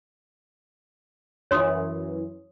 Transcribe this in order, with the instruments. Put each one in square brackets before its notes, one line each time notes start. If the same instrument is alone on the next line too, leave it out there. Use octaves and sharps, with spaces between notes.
[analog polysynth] F#2 E3 [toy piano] C#5 C6 D#6